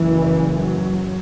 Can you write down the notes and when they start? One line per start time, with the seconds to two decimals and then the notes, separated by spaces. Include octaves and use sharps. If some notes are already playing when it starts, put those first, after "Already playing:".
Already playing: F#1 F#2 E3
0.58 F#3